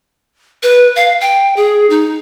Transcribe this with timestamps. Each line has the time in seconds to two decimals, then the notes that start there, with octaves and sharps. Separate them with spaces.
0.63 B4
0.96 F5
1.21 G5
1.56 G#4
1.90 D#4